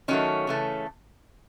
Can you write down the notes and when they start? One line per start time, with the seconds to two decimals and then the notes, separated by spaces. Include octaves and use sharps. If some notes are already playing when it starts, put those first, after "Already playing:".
0.08 D#3 F#3 A3 C#4
0.47 C#3 E3 A3